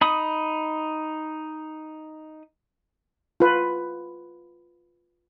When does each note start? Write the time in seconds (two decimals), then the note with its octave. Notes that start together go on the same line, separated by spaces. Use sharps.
0.01 D#4 B5 D#6
3.40 F4 B4